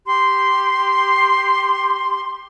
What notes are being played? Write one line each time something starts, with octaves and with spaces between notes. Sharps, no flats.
G4 C6